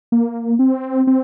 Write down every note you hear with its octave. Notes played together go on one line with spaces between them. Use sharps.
A#3
C4
C4